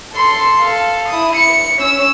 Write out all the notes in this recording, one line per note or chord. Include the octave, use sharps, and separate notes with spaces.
A4 C6
A4 F5
E4 D#6
C#7
C#4 E6